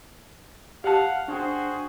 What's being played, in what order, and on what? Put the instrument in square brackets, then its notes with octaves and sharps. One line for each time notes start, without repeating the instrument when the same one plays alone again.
[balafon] G4 A5 [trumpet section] F5 F#5
[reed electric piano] D4 G5 [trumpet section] F#4 G#4 C5